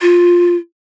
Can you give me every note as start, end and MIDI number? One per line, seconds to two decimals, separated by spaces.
0.01 0.56 65